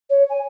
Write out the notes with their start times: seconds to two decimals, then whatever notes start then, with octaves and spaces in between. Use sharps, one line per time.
0.10 C#5
0.30 G#5